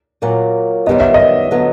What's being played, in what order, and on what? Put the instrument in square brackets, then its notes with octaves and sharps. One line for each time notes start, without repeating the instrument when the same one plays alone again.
[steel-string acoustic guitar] A#2 F#3 A#3
[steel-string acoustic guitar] F#2 D#3 G3 B3 [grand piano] D#5
[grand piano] E5
D#5
[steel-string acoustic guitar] D3 F#3 B3